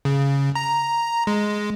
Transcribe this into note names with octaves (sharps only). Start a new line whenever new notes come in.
C#3
A#5
G#3